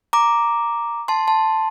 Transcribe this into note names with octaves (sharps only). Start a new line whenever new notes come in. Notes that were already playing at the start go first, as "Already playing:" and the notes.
A#5 D6
A5 C6
A5 C6